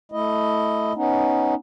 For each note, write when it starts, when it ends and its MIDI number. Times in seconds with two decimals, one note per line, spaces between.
0.12 0.93 57
0.12 0.93 64
0.12 0.93 75
0.96 1.54 59
0.96 1.54 61
0.96 1.54 63